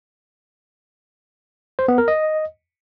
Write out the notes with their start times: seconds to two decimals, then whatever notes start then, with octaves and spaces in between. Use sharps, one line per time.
1.79 C5
1.88 B3
1.98 A#4
2.08 D#5